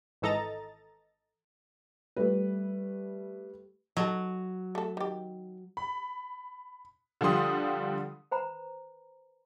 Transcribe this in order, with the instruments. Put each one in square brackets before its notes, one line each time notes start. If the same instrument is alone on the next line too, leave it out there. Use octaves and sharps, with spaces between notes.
[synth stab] G#1 E3 A4 D#5 A#5 A6
[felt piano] G3 A3 B4
[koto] F#3 [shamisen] D#4 F#4 A4
[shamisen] A3 A4
D#3 G4
[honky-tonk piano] B5
D3 F3 G3 G4 C6 D#6
[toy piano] B4 C5 A#5 B5